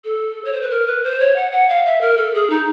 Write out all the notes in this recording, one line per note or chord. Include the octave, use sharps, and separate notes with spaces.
A4
C#5
C5
B4
A#4
B4
C5
C#5
F#5
F#5
F5
E5
A#4
A4
G#4
D#4